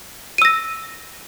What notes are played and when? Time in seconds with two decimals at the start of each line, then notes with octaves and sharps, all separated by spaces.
0.38 D#7
0.42 E6
0.45 A#6